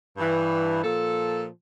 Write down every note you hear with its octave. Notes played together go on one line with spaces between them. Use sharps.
G2 E3
A#2 F3 A4